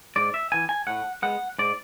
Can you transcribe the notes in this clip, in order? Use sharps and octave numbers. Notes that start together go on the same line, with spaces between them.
G#2 D5
E5
E3 B3 G#5
G#5
A2 F#5
G#3 B3 F#5
G#2 D5